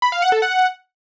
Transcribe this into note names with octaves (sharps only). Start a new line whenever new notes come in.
B5
F5
F#5
A4
F#5